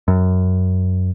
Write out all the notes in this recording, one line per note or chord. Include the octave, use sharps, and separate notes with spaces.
F#2